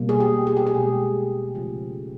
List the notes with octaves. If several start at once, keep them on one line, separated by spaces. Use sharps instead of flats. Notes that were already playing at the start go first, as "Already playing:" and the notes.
Already playing: B2 G3 A#3
G#4
G4
G#4
G4
G#4
B2 G#3
C#3 F3 A3